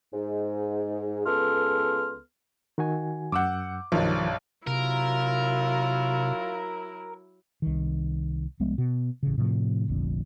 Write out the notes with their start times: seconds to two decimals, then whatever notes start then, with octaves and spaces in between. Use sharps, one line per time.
0.13 G#2
1.26 C#2 B3 A4 C6 F6
2.78 D#3 F#4 G#5
3.32 F#2 F#5 D6 E6 G6
3.92 B1 G2 D#3 F3
4.67 C3 F#3 E4 F4 A#4
7.62 C2 D#3
8.60 C2 F3 G#3 B3
8.78 B2
9.23 A1 C#3
9.38 A2 C3 F3
9.88 F1 A#1 F2 D3